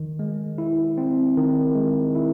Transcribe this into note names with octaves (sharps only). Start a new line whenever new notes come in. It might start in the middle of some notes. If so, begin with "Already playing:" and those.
Already playing: D#3
G#3
E4
C4
D#3
G#3
E4